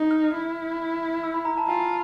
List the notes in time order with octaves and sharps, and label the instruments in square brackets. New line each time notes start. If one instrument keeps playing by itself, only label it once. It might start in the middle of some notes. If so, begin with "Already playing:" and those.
Already playing: [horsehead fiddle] D#4
[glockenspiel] F6
[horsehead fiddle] E4
[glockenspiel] E6
B5
A#5
A5
[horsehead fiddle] F4 [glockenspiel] G#5